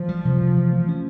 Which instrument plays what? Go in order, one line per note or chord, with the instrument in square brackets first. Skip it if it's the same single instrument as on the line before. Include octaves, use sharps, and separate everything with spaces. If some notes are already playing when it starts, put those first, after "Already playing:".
Already playing: [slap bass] E3 [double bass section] F3
[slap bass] G3
C3
C3
E3
A3
C#4